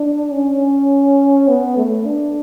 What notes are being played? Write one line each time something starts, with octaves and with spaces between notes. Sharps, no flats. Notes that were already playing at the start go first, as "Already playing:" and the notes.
Already playing: D4
C#4
B3
A3
D4